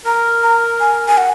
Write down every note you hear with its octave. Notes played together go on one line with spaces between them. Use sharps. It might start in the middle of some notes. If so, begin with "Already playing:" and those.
A#4 A#5
A#5
G#5
G#5
F#5